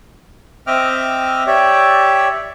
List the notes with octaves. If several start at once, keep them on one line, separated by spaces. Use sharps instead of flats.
C4 D#5 E5 G5 D6 F6
G4 C#5 D5 E5 G5